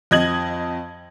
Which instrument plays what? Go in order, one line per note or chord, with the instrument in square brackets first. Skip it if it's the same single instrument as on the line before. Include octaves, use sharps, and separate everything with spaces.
[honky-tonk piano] F2 D#5 G#6 F#7